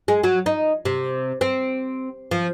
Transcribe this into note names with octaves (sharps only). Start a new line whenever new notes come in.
G#3
F#3
D#4
C3
C4
F3